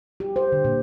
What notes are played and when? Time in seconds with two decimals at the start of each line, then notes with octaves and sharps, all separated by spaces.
0.20 G4
0.36 C5
0.52 D3
0.65 A#2